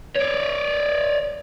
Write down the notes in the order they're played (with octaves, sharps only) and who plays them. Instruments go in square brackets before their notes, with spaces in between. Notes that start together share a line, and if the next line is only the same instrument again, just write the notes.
[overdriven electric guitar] C#5 D5